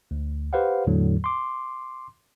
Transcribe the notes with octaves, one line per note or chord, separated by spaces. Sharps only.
D2
G4 B4 C5 F5 F#5
E2 A2 D3 F#3
C6 D6